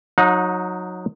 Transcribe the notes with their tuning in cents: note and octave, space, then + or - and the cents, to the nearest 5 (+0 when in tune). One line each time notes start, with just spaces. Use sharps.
F#3 -20 D#4 +0 F#5 -40